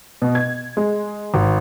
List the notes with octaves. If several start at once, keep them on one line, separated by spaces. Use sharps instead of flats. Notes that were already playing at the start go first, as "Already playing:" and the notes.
B2
G#6
G#3
G#1